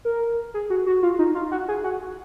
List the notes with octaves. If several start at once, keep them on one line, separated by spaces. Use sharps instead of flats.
A#4
G#4
F#4
F#4
F4
D#4
F4
F#4
G#4
F#4